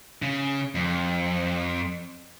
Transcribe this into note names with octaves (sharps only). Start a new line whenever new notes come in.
C#3
F2